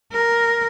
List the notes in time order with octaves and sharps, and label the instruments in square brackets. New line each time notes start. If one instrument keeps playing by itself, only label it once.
[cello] A#4